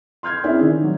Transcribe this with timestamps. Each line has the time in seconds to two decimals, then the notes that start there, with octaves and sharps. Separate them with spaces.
0.23 C6 F6 G6 G#6
0.44 C4 C#4 E4 G#4 D5
0.60 D#3
0.83 F#3